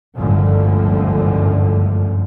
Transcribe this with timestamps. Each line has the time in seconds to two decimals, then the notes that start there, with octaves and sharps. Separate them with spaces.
0.15 G1 C#2 F#2 A2 D3 F3